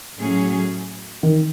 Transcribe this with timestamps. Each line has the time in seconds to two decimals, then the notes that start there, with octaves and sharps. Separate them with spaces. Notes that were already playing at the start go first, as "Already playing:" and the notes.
0.19 A2 F#3 C#4 G#4
1.23 D#3